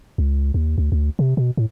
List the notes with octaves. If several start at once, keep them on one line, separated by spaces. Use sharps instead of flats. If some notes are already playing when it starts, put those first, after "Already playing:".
C#2
D#2
D2
D2
C3
B2
A2